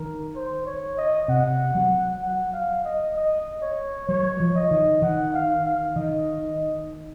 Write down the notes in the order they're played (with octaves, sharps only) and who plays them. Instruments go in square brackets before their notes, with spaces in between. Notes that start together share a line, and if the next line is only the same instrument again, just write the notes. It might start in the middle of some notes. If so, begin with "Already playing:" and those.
Already playing: [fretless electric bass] D#3 [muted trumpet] A#4
[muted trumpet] C5
C#5
D#5
[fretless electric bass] C3 [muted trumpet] F#5
[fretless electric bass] F#3
[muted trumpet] F#5
F5
D#5
D#5
C#5
[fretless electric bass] F#3 [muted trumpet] C#5
[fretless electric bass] F3
[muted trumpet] D#5
[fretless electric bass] D#3
[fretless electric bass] D#3 [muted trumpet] F#5
[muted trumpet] F5
F5
[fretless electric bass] D#3 [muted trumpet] D#5